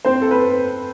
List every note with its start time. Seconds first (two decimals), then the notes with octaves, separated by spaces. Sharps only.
0.05 C4 C5
0.22 A4
0.31 B4